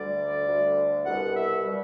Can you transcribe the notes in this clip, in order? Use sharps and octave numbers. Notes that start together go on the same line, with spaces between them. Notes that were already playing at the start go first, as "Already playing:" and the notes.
Already playing: D2 D3 G3 D5
D2 D3 G3
C2 B2 G3 F#5
E5
B2 G3